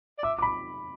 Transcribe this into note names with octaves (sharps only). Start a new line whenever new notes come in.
D5
E5 D6
D6
B5